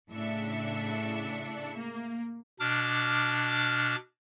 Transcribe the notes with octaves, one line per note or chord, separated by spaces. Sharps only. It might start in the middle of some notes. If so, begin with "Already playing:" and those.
A2 C#3 D4 E5 C#7
A#3
B2 D4 D6 F6